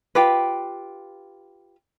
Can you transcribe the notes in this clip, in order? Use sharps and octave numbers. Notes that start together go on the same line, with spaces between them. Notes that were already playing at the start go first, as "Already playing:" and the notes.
F4 G4 B4